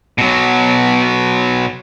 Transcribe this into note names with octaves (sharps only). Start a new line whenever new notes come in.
B2 F#3